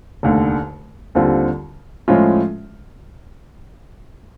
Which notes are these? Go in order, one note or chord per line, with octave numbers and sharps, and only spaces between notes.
F1 D#2 D3
D#2 D3 G3 C4 F4
A2 F3 G#3 C#4 F4